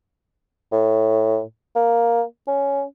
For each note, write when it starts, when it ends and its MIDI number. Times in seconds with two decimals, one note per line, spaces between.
0.72 1.42 45
1.76 2.23 58
2.48 2.83 61